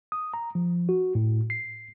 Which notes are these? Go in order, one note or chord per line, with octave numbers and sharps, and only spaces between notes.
D#6
A#5
F3
F#4
A2
C7